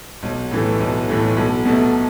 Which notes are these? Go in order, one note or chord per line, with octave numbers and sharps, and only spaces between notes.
B1
A2 E3 A3
B1
A2 E3 A3
B1
B2 A3